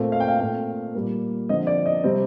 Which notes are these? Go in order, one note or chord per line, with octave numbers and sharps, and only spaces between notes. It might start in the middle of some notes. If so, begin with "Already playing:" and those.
Already playing: A#2 A3 C4
F5
G5
F5
A#2 A3 C4 F5
A#2 G3 A#3
D3 F3 C4 D#5
D5
D#5
C3 G3 C4